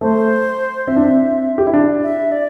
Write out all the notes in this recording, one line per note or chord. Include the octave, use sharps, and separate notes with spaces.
A3 C5
C4 E5
D4
C4
G4
E4
D4
E5
D5